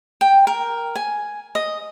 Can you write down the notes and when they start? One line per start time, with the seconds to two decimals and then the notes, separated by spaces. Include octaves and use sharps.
0.21 G5
0.47 A#4
0.96 G#5
1.55 D#5